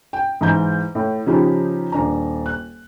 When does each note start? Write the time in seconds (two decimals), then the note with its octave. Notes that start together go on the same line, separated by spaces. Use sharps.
0.13 G5
0.41 G#2 E3 A#5 G6
0.95 A2
1.26 C#3 F3 D#4 G4 B5
1.92 D#1 D4 A#5
2.46 F#6